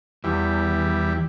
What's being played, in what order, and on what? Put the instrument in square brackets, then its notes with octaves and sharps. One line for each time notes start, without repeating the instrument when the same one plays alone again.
[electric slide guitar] E2 [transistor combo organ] E3 G3